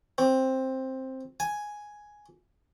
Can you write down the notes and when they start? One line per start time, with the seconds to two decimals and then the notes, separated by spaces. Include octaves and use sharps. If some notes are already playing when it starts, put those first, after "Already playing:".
0.18 C4
1.40 G#5